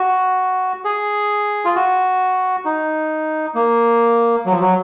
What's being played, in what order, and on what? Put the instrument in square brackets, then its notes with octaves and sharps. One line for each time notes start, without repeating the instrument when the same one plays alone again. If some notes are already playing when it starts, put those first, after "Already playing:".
Already playing: [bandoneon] F#4
G#4
F4
F#4
D#4
A#3
F#3
F3
F#3